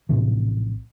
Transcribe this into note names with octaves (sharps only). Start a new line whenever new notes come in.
A#1 A2 C3 E3